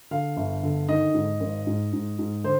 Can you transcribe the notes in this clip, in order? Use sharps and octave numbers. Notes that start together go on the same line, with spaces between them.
D3 F5
G1
D3
D#3 D#5
G#2
G#1
G#2
G#2
G#2
D3 C5